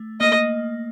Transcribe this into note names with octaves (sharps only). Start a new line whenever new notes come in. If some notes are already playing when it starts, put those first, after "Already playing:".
Already playing: A3
A#3 D#5